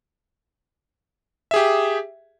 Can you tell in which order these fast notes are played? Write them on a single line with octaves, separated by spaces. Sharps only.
E5 G#4 G4